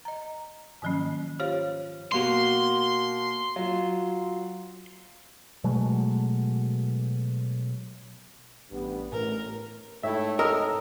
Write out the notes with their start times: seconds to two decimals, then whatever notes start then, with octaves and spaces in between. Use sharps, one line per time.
0.05 D#5 A#5
0.82 G#2 D#3 F3 F#3 A#3 C#4
1.39 F4 G4 C5 C#5 F5
2.12 B2 A#3 F#4 C6
3.56 F#3 F4
5.64 B2 F#3 G#3 A3
8.71 A1 G2 B3
9.12 A1 A2 A#4
10.03 G#2 A3 E4 C#5 E5 G5
10.39 A4 A#4 D#5 E6 F6